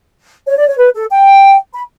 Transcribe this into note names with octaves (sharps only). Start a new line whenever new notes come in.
C#5
D5
C#5
B4
A4
G5
B5